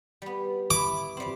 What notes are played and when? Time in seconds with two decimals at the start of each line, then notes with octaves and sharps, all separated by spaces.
0.22 G3 B3
0.71 E4 D6
1.17 G3 C4